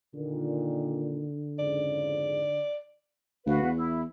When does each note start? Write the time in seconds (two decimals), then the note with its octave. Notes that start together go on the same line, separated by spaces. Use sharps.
0.15 A#2 D3 D#3
1.59 F2 G#2 C#3 D5
3.46 D2 F#4 B4 F5
3.62 E2
3.77 E4